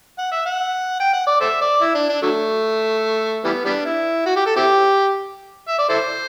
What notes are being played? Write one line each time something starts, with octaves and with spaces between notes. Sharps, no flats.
F#5
E5
F#5
G5
F#5
D5
A4 C5 E5
D5
E4
D4
D4
D3 F#3 A3
E3 G3 B3
G3 B3 D4
E4
F#4
G4
A4
C4 E4 G4
E5
D5
E4 A4 C5